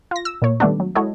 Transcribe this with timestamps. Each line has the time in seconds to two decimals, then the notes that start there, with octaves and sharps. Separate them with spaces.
0.11 F4 A#6
0.25 E6
0.42 A#2 A#3 C#5
0.60 D#3 G3 A3 B3 D4
0.80 F#3
0.95 G#3 E4 F#4 A4 C#5 D#5